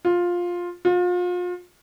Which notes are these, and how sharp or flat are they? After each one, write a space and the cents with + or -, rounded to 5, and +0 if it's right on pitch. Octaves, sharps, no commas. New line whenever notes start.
F4 +10
F4 +35